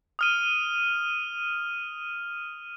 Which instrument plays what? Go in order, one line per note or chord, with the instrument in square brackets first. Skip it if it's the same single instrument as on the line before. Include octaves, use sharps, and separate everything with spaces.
[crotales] D#6 F6 D#7